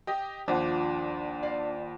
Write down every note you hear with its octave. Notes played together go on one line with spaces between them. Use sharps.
G4 D#5
D#2 F3 D4 F#5
D5 F5